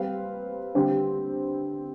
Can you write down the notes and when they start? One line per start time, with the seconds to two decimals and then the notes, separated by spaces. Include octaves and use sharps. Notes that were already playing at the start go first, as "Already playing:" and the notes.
Already playing: G3 C4 G4 B4 F5
0.75 D3 G3 C4 G4